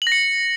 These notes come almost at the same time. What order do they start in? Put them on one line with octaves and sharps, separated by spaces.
F#7 A#6 C#7